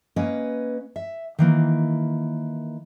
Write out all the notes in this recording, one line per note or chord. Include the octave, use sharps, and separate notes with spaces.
A#3 C#4 B4 D#5
E5
D#3 E3 A#3